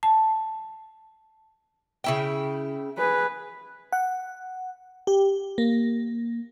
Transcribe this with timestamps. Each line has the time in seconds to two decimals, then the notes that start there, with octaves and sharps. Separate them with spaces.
0.03 A5
2.04 C#3 E4 G5
2.98 G#4 B4
3.92 F#5
5.07 G4
5.58 A#3